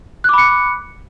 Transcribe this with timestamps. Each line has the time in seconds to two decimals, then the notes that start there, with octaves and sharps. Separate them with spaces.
0.24 F#6
0.29 D6
0.33 B5
0.38 C#7